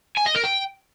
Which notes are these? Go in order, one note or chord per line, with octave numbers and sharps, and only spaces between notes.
G#5
D#5
A#4
G5